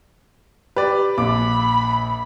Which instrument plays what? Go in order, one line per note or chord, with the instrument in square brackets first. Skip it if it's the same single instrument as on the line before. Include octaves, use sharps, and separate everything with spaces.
[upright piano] G4 [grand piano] B4 D5
[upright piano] A#1 [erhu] B5 [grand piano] D6